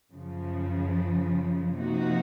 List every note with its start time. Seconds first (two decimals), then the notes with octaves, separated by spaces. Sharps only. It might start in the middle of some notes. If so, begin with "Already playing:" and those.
0.12 F#2 C#3 F3
1.74 C3 F3 A#3 D#4 F#4